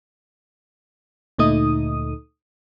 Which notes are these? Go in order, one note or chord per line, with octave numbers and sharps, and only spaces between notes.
D2 A#2 A3 D#4 D#6